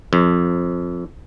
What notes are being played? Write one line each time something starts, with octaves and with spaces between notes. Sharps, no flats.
F2